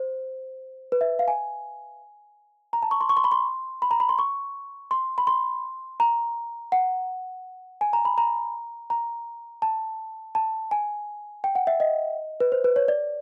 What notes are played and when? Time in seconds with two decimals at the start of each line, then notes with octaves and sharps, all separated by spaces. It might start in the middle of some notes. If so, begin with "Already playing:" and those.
Already playing: C5
0.92 B4
1.01 E5
1.19 F5
1.28 G#5
2.73 A#5
2.82 A5
2.91 C#6
3.01 C6
3.09 C#6
3.17 C6
3.24 B5
3.32 C6
3.82 B5
3.91 A#5
4.00 B5
4.09 C6
4.19 C#6
4.91 C6
5.18 B5
5.27 C6
6.00 A#5
6.72 F#5
7.81 G#5
7.93 A#5
8.05 B5
8.18 A#5
8.90 A#5
9.62 A5
10.35 A5
10.71 G#5
11.44 G5
11.55 F#5
11.67 E5
11.80 D#5
12.40 B4
12.52 C5
12.64 B4
12.76 C#5
12.88 D5